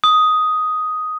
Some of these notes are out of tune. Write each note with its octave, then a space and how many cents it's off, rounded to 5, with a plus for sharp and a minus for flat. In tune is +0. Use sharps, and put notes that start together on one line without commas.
D#6 +5